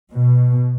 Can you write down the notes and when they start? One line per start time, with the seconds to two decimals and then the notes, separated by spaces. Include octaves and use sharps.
0.13 B2